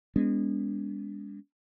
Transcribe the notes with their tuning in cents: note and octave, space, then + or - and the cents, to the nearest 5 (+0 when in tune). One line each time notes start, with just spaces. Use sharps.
G#3 -30 B3 +0 D4 -40